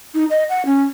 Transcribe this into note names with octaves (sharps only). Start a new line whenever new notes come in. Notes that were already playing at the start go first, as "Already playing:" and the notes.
D#4
D#5
F#5
C#4